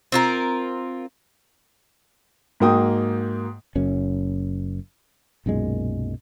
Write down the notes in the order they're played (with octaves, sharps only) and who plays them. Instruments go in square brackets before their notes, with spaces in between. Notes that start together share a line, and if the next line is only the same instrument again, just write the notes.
[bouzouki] C4 F4 A#4
[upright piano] G#2 F#3 A#3 G5 D#6
[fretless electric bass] F#1 F#2 C#4
B1 F#2 A#2 G#3